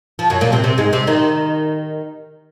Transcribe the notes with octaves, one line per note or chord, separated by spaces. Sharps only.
F3
F#2 F#3
A#2 A#3
C3 C4
C3 C4
G#2 G#3
C3 C4
D#3 D#4